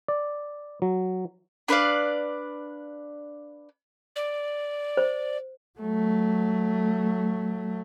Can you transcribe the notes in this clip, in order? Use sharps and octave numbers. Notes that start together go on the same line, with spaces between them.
D5
F#3
D4 B4 D5 F5
D5
C5
F#3 A3